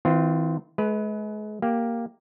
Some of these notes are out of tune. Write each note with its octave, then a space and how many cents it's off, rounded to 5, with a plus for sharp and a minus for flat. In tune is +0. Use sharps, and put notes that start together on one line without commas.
E3 -40 C4 -30 F4 -5
G#3 +35 B4 +0
A#3 +0 G4 +0